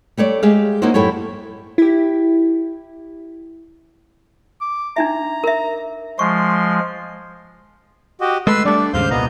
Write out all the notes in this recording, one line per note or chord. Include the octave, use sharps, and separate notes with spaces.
G3 A3 C#5 D5
G#3 G4 G#4 E5 F5
A#3 C#4 D#4 E4 F#4 C5
F#2 A2 E4 G4 A4 C#5
E4 G4
D6
D4 D#4 E5 A#5
A#4 E5
F3 G#3 C6 C#6
F#4 G4 D#5
G#3 A3 B4 C6 E6
G3 A3 D4 D5
D#2 G#2 C#3 C5 F5 G6
C2 A#2 B3 D#5 A#5